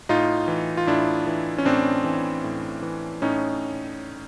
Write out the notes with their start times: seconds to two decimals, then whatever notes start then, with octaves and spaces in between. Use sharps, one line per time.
0.09 A2 D#4 F4
0.48 E3
0.77 F4
0.87 A2 D4 E4
1.27 E3
1.58 C#4
1.65 A2 C4 D4
2.04 E3
2.44 A2
2.82 E3
3.22 A2 C#4 D#4